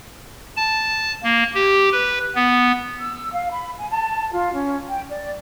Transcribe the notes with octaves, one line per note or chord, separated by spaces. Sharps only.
A5
A#3
G4
B4
B3
E6
F5
B5
G#5
A5
F4
C#4
G5
D5